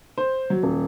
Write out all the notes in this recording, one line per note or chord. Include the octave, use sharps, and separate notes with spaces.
C5
F#3
D#1